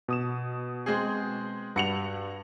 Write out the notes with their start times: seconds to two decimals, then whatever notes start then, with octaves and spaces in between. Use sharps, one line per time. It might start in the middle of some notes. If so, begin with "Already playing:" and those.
0.08 B2 D#6 E7
0.86 G#3 C4 G#4
1.76 G2 F#4 C#7 F7